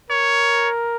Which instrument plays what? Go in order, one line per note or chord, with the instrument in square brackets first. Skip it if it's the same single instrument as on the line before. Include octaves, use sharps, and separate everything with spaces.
[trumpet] A#4 [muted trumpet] C#5